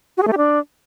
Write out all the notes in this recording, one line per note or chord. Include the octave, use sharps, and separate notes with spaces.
F#4
G#4
A3
G4
D4